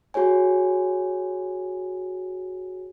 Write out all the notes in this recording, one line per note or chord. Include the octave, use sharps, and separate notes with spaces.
F#4 G#4 C#5 G#5